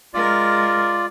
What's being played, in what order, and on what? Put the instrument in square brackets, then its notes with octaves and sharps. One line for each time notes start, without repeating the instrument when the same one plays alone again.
[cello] G#3 A#4 [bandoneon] F4 D5